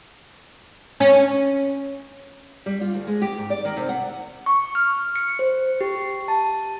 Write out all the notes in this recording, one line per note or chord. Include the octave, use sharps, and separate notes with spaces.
C#4
G3
F4
D2
G#3
G4
G#2
D5
D#3
C3
F#5
C#6
F6
C#7
C5
G4
A5